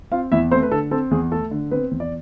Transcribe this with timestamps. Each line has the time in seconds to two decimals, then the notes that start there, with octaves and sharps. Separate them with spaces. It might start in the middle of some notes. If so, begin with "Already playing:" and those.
0.11 C4 F4 F5
0.32 E2 E4 E5
0.51 A3 C4 C5
0.63 B4
0.71 D3 A4
0.91 C4 A4
1.11 E2 G#4
1.31 A3 A4
1.51 D3
1.71 B3 C4 B4
1.91 E2
2.00 D5